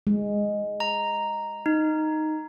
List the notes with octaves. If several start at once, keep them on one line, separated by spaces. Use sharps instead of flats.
G#3
A#5
D#4